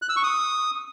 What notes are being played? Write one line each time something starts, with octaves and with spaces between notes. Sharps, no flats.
F#6
E6
C#6
D#6